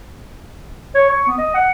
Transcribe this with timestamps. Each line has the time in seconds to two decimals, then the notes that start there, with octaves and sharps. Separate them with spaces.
0.94 C#5
1.10 C#6
1.27 B3
1.38 D#5
1.54 F#5